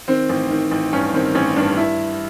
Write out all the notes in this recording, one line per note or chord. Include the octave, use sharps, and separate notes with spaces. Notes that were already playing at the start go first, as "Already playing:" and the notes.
D#3 C4
A1
D#3
A1
G2 C#4
D#3 C4
A1 C#4
G2 D4
E4